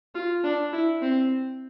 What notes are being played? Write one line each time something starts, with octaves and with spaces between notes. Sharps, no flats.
F4
D4
E4
C4